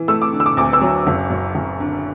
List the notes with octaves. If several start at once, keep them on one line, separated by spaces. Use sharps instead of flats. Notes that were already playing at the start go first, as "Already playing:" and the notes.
Already playing: E3
A3 E6
D6
D3
E6
D6
D2 D6
E6
F#3
F#1
F#2
F#1
D3